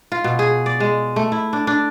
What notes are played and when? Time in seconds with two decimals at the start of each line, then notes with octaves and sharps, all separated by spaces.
0.12 F4
0.24 B2
0.39 G#4
0.66 D5
0.80 G#3
1.16 A3
1.32 E4
1.53 D4
1.67 D4